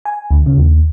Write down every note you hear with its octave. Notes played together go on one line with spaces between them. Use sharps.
G#5
D2
C#3
D#2